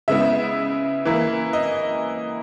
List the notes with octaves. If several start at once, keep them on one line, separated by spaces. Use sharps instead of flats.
C#3 G#3 B3 E4 E5
E3 A#3 E4
D#5